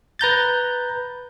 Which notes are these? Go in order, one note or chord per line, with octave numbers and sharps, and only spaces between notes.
B4 A#5 G6 A6